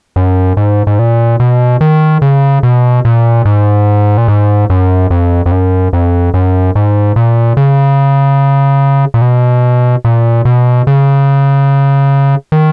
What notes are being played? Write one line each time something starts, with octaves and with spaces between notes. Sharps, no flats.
F#2
G#2
G#2
A#2
B2
D#3
C#3
B2
A#2
G#2
A#2
G#2
F#2
F2
F2
F#2
F2
F#2
G#2
A#2
C#3
A#2
B2
A#2
B2
C#3
D#3